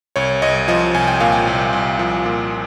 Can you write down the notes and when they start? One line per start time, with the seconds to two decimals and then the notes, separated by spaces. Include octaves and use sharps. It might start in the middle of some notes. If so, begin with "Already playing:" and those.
0.16 C2 C#5
0.42 C2 D#5
0.68 F3 D#5
0.94 C2 G#5
1.08 G5
1.20 A#2 F5
1.32 G5
1.47 C2
1.73 C2
1.99 F3
2.26 A#2